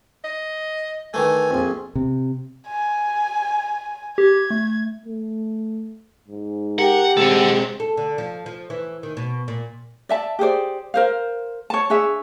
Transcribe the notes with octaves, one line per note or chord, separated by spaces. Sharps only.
D#5
D#3 E3 A3 G#5
A#1 F2
C3
G#5
G4 G#6
A3
A3
G#2
G4 A#4 F#5
B1 G#3 C4 A4 F#5
A4
D3
F3
F3
E3
D#3
B2
A#2
D5 E5 A5
G4 G#4 C5 D5
A#4 C5 F5
C#5 A5
D4 G#4 C#5 E5